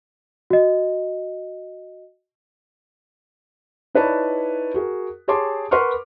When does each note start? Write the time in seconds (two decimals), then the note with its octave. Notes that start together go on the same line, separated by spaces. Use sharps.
0.50 F#4 D#5
3.95 D#4 E4 B4 C#5 D5 A5
4.74 F#4 G#4 A#4
5.28 G4 G#4 C#5 A5 C6 D6
5.71 A#4 B4 F#5 C6 C#6 F6